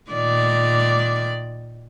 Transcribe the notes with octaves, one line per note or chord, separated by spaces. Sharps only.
A#2 D#3 D5